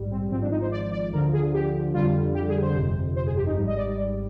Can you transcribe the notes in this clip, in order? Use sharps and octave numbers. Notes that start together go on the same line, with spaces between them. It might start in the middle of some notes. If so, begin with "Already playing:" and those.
Already playing: A#1 G#2 G3
C4
G#1 G#2 F3 C4
D4
D#4
C5
D5
D5
D2 D3 F3 A#4
G#4
G4
F2 D3 G3 F4
G4
G#4
C5
G1 F2 C3
C5
G#4
G4
D#4
G#1 G#2 G3
D#5
D5
D5